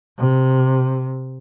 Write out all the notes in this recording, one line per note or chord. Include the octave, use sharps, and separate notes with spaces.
C3